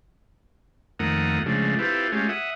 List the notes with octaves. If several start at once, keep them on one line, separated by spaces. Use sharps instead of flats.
F2 D#3 A3 A#3 F#5 D#6
C#3 F3 G#3 A3 D4
C4 E4 F4 G4 A4 B4
G#3 A3 C#4 F4 G4
E5 F#5 D#6